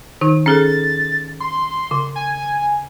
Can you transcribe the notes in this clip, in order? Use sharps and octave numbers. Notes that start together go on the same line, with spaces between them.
D#3 D#4
C#4 G#4 A4 A6
C6
C#3
G#5